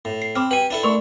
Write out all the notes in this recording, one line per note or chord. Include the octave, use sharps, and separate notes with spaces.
A2
C7
C4 B5 D6 F6
G4 B4 G5 G#5
D4 E4 A4
A3 A#4 D5 C6 C#6